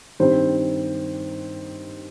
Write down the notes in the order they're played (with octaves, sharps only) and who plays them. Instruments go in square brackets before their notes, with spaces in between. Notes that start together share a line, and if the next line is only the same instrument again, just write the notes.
[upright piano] G2 D#3 G3 C4 C5